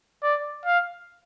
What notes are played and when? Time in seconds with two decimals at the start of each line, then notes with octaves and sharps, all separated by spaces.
0.23 D5
0.66 F5